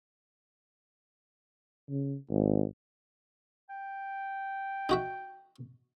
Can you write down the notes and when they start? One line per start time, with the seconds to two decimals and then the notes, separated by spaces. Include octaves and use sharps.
1.90 C#3
2.30 G#1
3.70 G5
4.89 D#4 F#4 E5